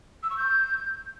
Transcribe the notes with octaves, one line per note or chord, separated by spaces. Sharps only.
E6
C#6
G6